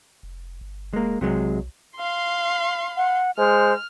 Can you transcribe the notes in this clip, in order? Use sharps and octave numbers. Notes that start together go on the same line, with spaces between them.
F1
G1
D#1 G#3 A#3
B1 C3 F#3 G#3
F5 C6
F#5
G#3 C5 F6